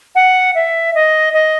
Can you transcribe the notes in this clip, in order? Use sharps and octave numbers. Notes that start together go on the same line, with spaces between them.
F#5
E5
D#5
D#5